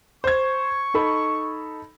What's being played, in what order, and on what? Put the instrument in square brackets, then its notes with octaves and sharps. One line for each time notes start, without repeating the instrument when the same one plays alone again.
[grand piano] C5 G#6 [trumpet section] C#6
[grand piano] D#4 A4 B5